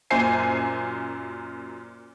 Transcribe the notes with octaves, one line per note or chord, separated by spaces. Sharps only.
F#2 A#2 C5 G#5 C7